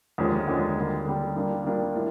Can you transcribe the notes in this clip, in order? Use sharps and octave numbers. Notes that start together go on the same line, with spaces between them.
D#2 D3 F3 G#3 C#4
D#2 D3 F3 G#3 C#4
D3 G3 A#3
D3 G3 A#3
D#3 G3 A#3 D4 F4
D#3 G3 A#3 D4 F4
A2